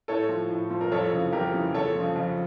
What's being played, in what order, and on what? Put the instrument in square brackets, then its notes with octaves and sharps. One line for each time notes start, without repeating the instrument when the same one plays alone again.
[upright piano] A2 A4 C#5
F3
A2
F3
A#4
F2 A4 C#5
C#3 E3
F2 G4 A#4
C#3 E3
F2 A4 C#5
F3
C#3
F2